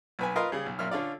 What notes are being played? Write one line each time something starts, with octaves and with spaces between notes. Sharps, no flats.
B1 B4 G#5
F4 A#4 B4 D#5 C6
C#3 G3 G#4
B1
F#2 A#2 E5 F6
D3 C#4 F4 D5